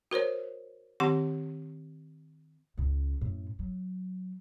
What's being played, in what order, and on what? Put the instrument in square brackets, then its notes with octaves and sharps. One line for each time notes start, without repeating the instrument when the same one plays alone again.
[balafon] F#4 A#4 C5 C#5
D#3 C4 G4 F#5 C6
[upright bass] C#2 C#3
F#2 A2
F#3